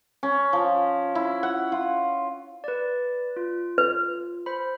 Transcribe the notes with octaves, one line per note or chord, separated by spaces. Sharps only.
C#4
F3
E4
F#5
F4
B4 D5
F4
B4
C5 B5